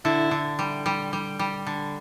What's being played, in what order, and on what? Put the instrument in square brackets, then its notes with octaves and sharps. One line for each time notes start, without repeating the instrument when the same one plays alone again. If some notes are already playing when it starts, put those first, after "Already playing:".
[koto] D3 [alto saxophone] E4
[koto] D3
G3
G3
G3
G3
D3